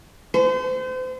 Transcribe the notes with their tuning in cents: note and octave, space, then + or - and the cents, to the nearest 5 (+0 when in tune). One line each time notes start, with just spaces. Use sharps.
C5 -35